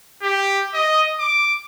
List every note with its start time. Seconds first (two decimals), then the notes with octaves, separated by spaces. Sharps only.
0.23 G4
0.74 D#5
1.19 D6